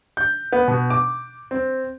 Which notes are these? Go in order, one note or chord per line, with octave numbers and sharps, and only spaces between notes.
G6
B3
B2
D6
C4